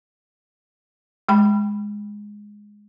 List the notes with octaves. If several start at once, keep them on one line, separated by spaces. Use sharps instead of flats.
G#3 G5 B5